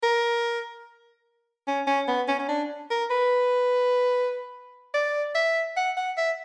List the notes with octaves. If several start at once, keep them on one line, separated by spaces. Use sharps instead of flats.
A#4
C#4
C#4
B3
C#4
C#4
D4
A#4
B4
D5
E5
F#5
F#5
E5